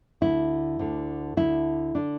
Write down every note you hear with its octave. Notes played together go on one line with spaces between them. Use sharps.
D2 D3 E4
D2 D3
D2 D3 E4
D3 D4